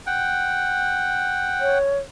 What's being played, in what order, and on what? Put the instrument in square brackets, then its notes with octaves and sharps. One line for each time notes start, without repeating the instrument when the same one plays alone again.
[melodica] F#5 G5
[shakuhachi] C#5